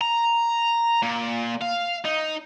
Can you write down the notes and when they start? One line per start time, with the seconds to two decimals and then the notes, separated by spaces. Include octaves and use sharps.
0.01 A#5
1.02 A#2
1.61 F5
2.05 D#4